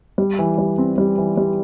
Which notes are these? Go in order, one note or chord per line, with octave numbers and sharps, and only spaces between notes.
G3
E3
G3
C4
G3
E3
G3